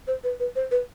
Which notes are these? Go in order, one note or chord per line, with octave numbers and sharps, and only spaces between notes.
C5
B4
B4
C5
B4